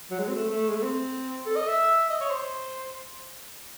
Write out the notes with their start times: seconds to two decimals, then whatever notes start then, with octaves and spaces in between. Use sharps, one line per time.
0.11 F#3
0.19 G#3
0.28 C4
0.35 A3
0.51 A3
0.69 G#3
0.76 A3
0.83 C4
1.46 A4
1.57 D#5
1.68 E5
2.10 D#5
2.21 C#5
2.31 C5